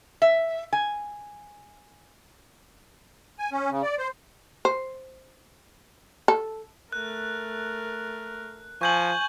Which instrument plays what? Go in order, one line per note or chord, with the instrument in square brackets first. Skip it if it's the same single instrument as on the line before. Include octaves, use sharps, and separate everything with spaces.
[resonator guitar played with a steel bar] E5
G#5
[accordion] G#5
C#4
C#3
D5
C5
[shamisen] C5
A4
[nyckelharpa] A3 A#4 [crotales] F#6
[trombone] F3 [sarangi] G#5 [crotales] C#6 G6 F#7